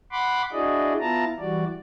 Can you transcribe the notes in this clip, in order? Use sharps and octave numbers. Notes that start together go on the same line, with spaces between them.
F#5 B5 C6 D6
D4 E4 F#4 G#4 D5 D#5
B3 E4 F4 A5 A#5
E3 G3 F#4 D5